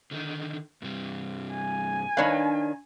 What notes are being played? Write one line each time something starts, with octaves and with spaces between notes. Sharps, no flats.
D3 D#3 D#4
G2 C3 G3
G#5
D#3 D4 B4 C#5 F5